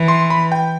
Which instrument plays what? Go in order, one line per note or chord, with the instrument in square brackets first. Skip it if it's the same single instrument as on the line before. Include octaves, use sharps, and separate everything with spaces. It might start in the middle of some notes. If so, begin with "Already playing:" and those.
Already playing: [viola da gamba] E3
[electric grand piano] C6
B5
G5